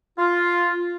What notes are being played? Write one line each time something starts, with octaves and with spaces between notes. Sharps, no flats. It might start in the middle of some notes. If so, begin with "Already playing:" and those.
F4